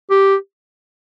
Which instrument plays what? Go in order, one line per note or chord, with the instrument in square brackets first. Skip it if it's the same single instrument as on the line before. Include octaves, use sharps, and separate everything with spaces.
[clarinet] G4